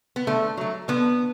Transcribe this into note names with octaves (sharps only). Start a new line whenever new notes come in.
B3
D3 A3
F#3 A3
D3 B3